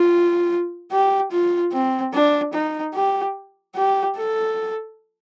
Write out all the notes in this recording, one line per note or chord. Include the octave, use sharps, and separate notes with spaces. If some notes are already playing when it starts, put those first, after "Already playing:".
Already playing: F4
G4
F4
C4
D4
D#4
G4
G4
A4